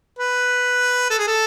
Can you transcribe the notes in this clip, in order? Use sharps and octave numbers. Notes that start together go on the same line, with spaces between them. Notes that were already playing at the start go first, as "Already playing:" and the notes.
B4
A4
G#4
A4